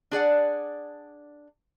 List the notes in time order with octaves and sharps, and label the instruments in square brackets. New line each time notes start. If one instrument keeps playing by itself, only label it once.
[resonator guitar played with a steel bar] D4 G#4 D5 F#5